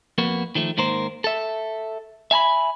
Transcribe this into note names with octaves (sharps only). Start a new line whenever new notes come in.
F2 A#3 B3 F#4
D#3 F3 A3
G#2 D#3 A#3 A#4 C5
A4 E5
E5 G#5 A#5 B5